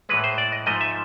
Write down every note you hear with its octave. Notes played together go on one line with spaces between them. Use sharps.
A2 E3 G#3 B4
C5
D5
D#5
G#2 F3 A3 D#5
E5